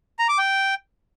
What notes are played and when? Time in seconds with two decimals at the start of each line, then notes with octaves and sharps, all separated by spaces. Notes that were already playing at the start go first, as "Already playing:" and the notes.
0.19 A#5
0.29 D6
0.38 G5